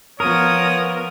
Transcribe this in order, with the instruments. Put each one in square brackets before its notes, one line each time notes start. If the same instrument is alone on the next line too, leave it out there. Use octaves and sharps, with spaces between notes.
[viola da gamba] F3 B3 [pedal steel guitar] A#4 [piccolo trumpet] C#5 [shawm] D#6